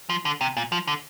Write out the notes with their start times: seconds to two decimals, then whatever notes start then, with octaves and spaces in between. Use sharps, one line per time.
0.10 F3
0.25 D3
0.41 C3
0.57 A#2
0.72 F3
0.88 D3